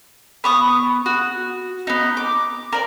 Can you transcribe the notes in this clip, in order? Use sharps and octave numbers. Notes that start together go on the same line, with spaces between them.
B3 C#6 D#6
F#4
B3 D#4
D6
A#4 D5